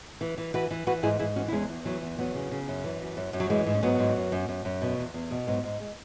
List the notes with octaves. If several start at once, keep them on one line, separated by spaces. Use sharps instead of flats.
E3
E3
E3 F#4 B4
E3
E3 F#4 B4
G#2 E4 G#4
G#2 E4 G#4
E3 C#4 F#4
E4
E2 G#3 C#4
E2
E3 F#3 B3
E2
E3 F#3 B3
C#3
C#3
F#2
E3
F#2
F#2
F#2
F#3
E3 G#3
G#2
C#4
G#2 F#3 B3
G#2
F#2
F#2
F#2
F#2
B2
E2
E2
B2
G#2 F#3 B3
G#2
G#3